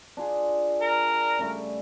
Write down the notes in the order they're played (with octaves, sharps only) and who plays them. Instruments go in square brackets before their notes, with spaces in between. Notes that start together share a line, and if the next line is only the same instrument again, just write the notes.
[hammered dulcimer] D4 F4 G#4
[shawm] A#4
[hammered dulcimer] C#3 G3 A3